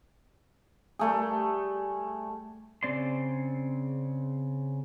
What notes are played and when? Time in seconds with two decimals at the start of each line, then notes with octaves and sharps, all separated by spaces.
0.99 G3 A3 G#4
2.83 C#3 C4 D5 C6